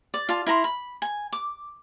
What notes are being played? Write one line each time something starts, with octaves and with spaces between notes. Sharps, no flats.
D5
F4 A5
E4 A#4 A#5 C6
B5
G#5
D6